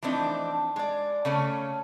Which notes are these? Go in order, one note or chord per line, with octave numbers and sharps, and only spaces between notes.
E3 F3 A3 C4 D4 D#4
G#3 D5
C#3 A3 C#4